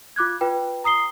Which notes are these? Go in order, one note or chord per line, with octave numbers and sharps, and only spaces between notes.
F4 D6 F#6 G#6
F4 B4 G5
A#5 D#6 C7 G7